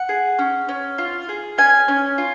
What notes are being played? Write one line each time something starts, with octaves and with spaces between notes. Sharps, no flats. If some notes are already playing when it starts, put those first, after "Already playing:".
Already playing: F#5
G#4
C#4
C#4
F4
G#4
C#4 G#5
C#4
F4